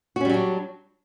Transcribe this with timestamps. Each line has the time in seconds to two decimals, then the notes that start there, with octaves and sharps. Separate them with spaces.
0.16 F#4
0.21 C#4
0.25 G3
0.30 F#3
0.34 D4